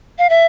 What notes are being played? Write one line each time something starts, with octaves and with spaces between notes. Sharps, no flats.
F5
E5